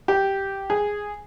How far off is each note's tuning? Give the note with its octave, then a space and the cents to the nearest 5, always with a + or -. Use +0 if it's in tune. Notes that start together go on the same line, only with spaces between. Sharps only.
G4 -5
G#4 -5